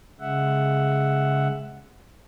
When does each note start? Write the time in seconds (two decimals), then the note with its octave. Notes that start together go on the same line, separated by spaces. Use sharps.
0.20 C#3 G#3 E5 F#5